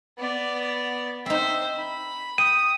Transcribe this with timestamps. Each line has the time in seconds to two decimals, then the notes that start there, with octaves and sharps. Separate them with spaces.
0.18 B3 D5
1.26 C4 D#4 C5 E5
1.76 B5
2.38 G5 D#6 D#7